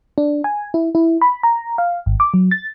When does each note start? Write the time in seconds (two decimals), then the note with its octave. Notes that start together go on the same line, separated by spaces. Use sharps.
0.18 D4
0.44 G#5
0.74 E4
0.95 E4
1.21 B5
1.43 A#5
1.78 F5
2.06 G#1
2.20 D6
2.34 F#3
2.51 A6